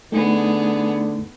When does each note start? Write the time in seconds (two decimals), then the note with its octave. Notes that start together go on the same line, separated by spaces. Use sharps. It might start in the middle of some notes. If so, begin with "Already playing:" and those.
0.12 D3 A3 B3 D#4 G#4